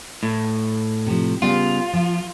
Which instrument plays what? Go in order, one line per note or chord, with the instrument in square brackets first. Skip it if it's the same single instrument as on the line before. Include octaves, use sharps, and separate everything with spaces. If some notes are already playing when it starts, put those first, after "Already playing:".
[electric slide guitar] A2
[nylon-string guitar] C3 F3
[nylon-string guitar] C#3 G3 B3 [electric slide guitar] F4
[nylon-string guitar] F3